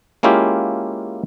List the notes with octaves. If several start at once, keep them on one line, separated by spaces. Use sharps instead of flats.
G#3 A#3 C#4 E4 F4 G4